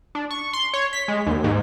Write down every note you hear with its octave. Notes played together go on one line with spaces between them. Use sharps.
D4
C#6
C6
C#5
B6
G#3
D#2
G#2